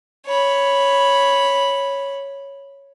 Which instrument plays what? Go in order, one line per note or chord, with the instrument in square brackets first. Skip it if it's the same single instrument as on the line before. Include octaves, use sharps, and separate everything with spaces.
[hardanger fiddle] C#5 B5